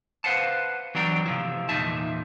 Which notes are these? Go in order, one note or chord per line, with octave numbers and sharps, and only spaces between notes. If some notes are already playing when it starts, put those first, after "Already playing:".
B4 C5 F5 F#5 A5
E3 F#3 B3 D4 G5 A#5
C3 F3 E4
E2 A#2 D#4 E5 A5